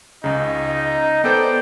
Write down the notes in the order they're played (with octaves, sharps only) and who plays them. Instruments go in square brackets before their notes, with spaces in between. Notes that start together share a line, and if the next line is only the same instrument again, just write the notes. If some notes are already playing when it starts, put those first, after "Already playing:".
[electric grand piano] C#2 C#3 [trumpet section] D#4
[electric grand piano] B3 A4 C5 [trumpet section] D5 G5